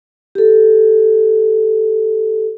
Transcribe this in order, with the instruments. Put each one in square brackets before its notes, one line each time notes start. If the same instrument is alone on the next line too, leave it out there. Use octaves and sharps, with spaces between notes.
[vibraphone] G4 A4